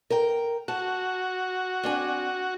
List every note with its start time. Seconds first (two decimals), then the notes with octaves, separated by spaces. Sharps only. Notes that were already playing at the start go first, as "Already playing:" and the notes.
0.10 A#4 G5
0.68 F#4 A5
1.83 C4 D4 G#5